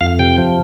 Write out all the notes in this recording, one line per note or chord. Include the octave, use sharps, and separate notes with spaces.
F2 F5
C3 G5
F3